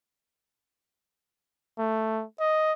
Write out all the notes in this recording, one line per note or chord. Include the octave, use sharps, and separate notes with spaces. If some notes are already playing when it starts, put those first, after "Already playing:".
A3
D#5